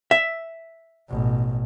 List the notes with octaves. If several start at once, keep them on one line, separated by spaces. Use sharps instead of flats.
E5
A1 B2